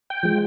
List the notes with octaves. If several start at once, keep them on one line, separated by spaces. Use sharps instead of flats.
G5
F3 G#3